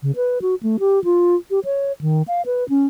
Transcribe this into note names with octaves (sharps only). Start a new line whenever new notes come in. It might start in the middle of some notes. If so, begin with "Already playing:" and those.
C#3
B4
F#4
A3
G4
F4
G4
C#5
D#3
F5
B4
C#4